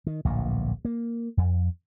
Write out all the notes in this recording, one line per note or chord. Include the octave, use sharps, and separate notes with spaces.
D#3
D1 A#1 A#2
A#3
F2